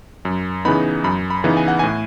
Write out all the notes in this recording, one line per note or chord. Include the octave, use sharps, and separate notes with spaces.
F#2
C#3 E3 B3 D#4 B5
F#2 B5
B5
C#3 E3 B3 D#4
G#5
F#5
A2 G#5